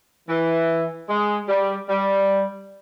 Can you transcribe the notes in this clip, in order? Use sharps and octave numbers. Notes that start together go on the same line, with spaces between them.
E3
G#3
G3
G3